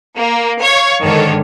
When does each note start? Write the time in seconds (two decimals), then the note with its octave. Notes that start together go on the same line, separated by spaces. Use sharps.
0.16 A#3
0.62 C#5 F5
1.01 G#2 D3 D#3 A4 C#5